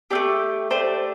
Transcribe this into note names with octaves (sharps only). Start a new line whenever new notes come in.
A3 C4 G4 D5
A3 D4 G4 C5